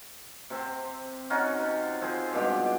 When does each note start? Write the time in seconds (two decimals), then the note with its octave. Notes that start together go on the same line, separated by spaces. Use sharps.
0.50 C3 C4
1.30 C#4 D#4 F4 F#4
1.59 C3
2.01 F3 C4 G#4 C5
2.33 G2 B2 G#3 G4